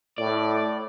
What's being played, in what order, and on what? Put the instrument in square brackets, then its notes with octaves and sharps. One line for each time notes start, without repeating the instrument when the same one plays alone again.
[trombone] A2 [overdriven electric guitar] D5